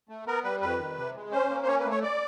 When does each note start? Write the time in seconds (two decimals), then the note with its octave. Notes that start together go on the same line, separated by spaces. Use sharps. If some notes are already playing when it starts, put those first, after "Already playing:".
0.09 A3
0.26 B3 A#4
0.44 G3 B4
0.61 F2 B4
0.79 D#3
0.97 C3
1.15 G#3
1.32 C#4 C5
1.50 A#3
1.63 C5
1.67 C#4 C#5
1.80 B4
1.85 A3
1.91 C#5
2.03 D5